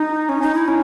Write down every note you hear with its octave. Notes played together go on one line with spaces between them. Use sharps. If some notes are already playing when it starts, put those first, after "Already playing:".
Already playing: D#4
C#4
D#4
E4
C#4